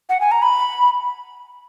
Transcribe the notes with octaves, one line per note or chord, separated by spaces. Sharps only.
F#5
G#5
A#5
B5